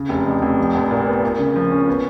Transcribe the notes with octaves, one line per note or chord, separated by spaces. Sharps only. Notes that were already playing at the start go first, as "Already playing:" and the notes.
Already playing: C#3
F1
F2
F1
F3
A#1
A#2
B3
A#3
C#3
F3
C#4
B3